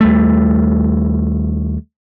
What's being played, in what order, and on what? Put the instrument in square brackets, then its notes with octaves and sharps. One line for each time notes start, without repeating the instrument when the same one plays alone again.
[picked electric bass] D#2 G3 A3